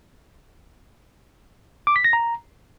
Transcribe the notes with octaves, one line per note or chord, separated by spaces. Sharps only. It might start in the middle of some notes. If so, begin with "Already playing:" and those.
D6
B6
A#6
A#5